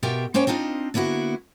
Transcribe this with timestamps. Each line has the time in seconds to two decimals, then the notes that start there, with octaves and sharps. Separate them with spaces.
0.03 B2 F4 G4 A#4 E5 G5
0.34 A#3 C#4 C5 C#5 G5
0.47 C4 D4 D#4 F4 D#5
0.94 D3 A#3 B3 E4 F#4